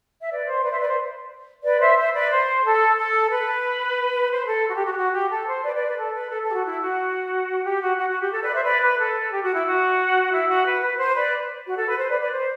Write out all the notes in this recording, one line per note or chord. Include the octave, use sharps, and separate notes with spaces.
E5
B4 D5
C5
B4 D5
C5 E5
B4 D5
C5
B4 D5
C5 E5
C5 E5
B4 D5
C5
A4
A4
B4
C5
A4
F#4
G4
F#4
G4
F#4
G4
A4
C5
B4 D5
B4 D5
B4
A4
B4
A4
A4
G4
F#4
E4
F#4
G4
F#4
F#4
F#4
G4
A4
B4 D5
C5 E5
B4 D5
B4
A4
G4
F#4
E4
F#4
E4
F#4
B4
B4
C5
B4 D5
F#4
A4
B4
C5
B4 D5
B4 D5
C5